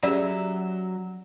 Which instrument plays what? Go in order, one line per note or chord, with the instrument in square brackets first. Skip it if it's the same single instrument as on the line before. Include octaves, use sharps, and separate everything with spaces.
[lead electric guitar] F#3 E5 [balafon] C#4 G4 G#4 [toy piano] D5